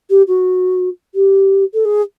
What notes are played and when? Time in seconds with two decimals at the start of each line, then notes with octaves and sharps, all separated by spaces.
0.10 G4
0.27 F#4
1.14 G4
1.74 A4
1.85 G#4